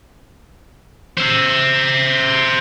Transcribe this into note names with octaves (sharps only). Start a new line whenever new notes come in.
C5 E5